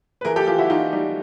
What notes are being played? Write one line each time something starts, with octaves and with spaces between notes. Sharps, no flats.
B4
E3 G#4 A#4
G4 A4
E3 F4 G4
E4 F#4
E3 D#4 F4
G3 D#4